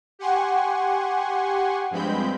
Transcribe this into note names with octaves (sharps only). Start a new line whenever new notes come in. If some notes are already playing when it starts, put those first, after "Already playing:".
G4 F#5 G#5 C6 C#6
G2 F3 G#3 C4 B5 G6